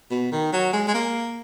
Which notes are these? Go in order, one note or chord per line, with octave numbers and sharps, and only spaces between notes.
B2
D#3
F#3
G#3
G#3
A#3